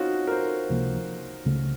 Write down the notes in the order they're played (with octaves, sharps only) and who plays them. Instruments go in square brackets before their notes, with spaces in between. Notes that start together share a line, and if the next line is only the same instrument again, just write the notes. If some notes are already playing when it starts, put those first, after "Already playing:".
Already playing: [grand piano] C4 C#4 D#4 F4 F#4
A#4
C5
[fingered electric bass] C#2 C3 F3 A#3
C#2 C#3 A3